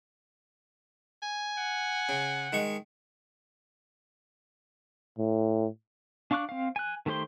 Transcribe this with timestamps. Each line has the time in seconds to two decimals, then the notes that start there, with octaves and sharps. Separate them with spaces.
1.23 G#5
1.58 F#5
2.09 C#3
2.53 D#3 G#3 C#6
5.18 A2
6.31 D4 F5 C#6 D6 F#6
6.49 C4 F5
6.76 G#5 F#6
7.06 D#3 A3 G4 C5 C6